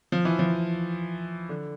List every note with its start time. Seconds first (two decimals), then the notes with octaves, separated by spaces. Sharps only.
0.12 F3
0.25 E3
0.39 F3
1.49 D3